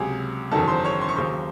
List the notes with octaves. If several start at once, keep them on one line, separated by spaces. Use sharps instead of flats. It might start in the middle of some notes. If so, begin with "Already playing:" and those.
Already playing: C#2 C3 F#3 G#4
F#1 E2 D#3 F#3 A4 A5
C5 C6
C#5 C#6
C6
C#6
D#2 C#3 F#3 C5 C6